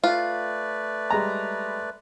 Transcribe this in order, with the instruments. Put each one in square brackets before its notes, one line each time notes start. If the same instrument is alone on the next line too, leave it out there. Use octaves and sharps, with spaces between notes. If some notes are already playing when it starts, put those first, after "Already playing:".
[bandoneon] A3 B4 D5 [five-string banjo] F4
[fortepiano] G3 G#3 A#5